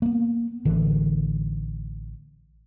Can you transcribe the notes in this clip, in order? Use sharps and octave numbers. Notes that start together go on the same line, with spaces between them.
A#3 B3
A1 D3 E3